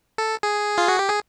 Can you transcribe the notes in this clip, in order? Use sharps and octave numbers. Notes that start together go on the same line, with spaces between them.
A4
G#4
F4
F#4
G4
G#4